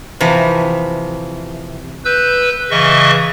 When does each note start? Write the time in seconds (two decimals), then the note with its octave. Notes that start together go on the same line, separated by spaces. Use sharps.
0.20 C3 E3 F3
2.05 B4 E6 G6
2.71 C#3 E3 D#5 E5 C#6